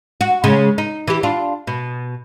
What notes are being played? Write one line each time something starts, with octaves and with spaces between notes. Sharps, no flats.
F#4
C#3 G#3
D#4
E3 G4
D4 F4
B2